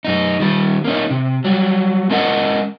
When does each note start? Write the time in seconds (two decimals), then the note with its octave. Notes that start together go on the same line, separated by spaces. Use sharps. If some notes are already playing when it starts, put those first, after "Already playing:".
0.05 F#2 D#4
0.40 D#3 G3
0.84 A#3 C#4 D#4
1.11 C3
1.45 F#3 G3
2.09 G#3 C#4 A#4 D#5 F#5